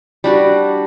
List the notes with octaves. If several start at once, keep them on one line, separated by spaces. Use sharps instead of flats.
G3 D4 F#4